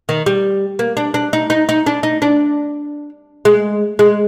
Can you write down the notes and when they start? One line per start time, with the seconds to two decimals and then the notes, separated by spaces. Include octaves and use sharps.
0.09 D#3
0.26 G3
0.79 A#3
0.97 D4
1.14 D4
1.33 D#4
1.50 D#4
1.69 D#4
1.86 D4
2.03 D#4
2.22 D4
3.45 G#3
3.99 G#3